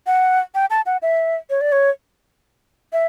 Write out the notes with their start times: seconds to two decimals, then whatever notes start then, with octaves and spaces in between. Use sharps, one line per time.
0.07 F#5
0.55 G5
0.70 A5
0.86 F#5
1.02 E5
1.50 C#5
1.61 D5
1.72 C#5
2.93 E5